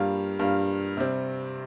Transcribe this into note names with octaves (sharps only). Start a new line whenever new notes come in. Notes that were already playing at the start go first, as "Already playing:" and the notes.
Already playing: G2 G3 A#3 F4
G2 G3 A#3 F4
C3 G3 C4